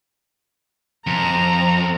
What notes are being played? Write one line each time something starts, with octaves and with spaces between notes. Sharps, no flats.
F2 A#5